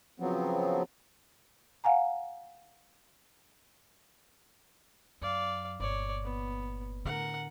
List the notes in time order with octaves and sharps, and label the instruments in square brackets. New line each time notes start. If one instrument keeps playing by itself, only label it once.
[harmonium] C#3 F3 F#3 B3 C4
[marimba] F5 F#5 G#5 A#5
[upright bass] F#2 [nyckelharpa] D5 F5
[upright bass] G1 A#2 [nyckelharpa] C#5 D5
[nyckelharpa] B3
[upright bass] A2 D3 [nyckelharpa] A#4 F#5